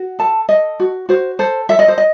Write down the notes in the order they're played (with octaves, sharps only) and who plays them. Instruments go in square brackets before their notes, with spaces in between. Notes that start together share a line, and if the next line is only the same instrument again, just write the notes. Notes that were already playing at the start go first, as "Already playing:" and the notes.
Already playing: [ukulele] F#4
A4 A5
A4 D#5
F#4
F#4 C5
A4 C5
A4 E5
D#5
C5
D#5